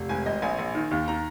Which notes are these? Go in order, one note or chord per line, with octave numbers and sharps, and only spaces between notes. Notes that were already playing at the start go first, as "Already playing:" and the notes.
Already playing: F1
G#1 G#5
G#1 D#5
A#1 G#5
A#1
D#3
D#2
D#3 A#5